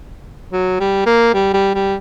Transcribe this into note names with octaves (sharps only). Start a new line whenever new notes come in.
F#3
G3
A#3
G3
G3
G3